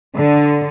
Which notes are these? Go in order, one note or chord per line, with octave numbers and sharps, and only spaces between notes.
D3